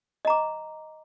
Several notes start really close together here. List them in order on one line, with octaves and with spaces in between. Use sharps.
D#5 A#5 D6